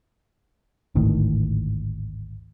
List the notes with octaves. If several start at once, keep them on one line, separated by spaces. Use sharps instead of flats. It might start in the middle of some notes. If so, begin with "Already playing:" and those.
G#1 D2 A2 D#3